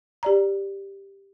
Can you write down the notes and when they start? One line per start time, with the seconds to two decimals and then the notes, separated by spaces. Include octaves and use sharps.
0.23 G4 D5 A#5